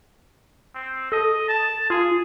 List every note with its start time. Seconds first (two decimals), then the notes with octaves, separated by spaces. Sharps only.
0.75 C4
1.12 A4 D#5
1.49 A5
1.90 F4 G#4